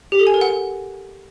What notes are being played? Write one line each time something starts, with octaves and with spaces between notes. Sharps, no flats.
G4
A4
G#5
A#4
F#5